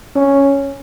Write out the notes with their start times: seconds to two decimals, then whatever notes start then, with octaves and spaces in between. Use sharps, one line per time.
0.15 C#4